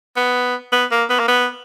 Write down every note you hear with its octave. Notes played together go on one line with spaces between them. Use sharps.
B3
B3
A#3
B3
A#3
B3